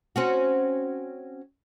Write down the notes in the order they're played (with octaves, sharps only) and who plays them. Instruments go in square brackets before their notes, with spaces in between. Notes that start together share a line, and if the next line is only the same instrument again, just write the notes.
[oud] C4 C#4 F#4